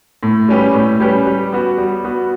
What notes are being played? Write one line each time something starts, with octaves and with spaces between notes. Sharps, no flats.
A2
G3 C#4 G4 B4
A2
G3 C#4 G4 B4
G3
B3 F#4
G3
B3 F#4